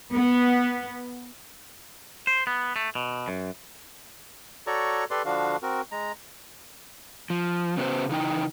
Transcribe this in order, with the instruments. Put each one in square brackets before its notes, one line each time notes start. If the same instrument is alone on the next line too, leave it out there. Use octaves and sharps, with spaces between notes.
[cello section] B3
[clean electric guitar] C5
B3
A3
B2
F#2
[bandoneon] F#4 A4 C#5 D5 A#5 C#6
G4 A4 B4 D5 C6
D3 F3 D4 F#4 F5
C4 F#4 A#4
G#3 A#5
[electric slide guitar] F3
C#3 B3 C#4 F#4 C5
C#3 E3 D#4 G5